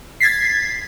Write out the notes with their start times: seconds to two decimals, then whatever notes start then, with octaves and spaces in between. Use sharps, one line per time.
0.20 G#6 A6 B6 C7